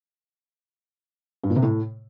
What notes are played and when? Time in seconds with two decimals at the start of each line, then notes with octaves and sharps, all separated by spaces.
1.43 G2
1.50 A#2
1.56 C3
1.63 A2